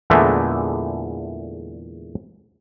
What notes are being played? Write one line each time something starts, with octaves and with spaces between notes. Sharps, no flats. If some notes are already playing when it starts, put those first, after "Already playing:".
E2 A#2 D3 E3 G#3 A3